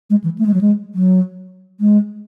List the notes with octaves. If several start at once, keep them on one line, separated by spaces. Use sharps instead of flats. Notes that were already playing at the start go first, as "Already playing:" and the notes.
G#3
E3
A3
G#3
F#3
G#3
F#3
G#3